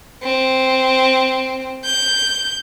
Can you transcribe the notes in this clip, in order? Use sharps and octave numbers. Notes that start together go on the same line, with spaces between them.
C4
G6